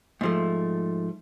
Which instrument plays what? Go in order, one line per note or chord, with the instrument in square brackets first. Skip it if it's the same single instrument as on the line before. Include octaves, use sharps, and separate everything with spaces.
[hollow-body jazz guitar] G#2 F3 A3